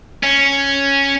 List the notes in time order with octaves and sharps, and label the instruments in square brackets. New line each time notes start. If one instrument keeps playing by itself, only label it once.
[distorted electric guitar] C#4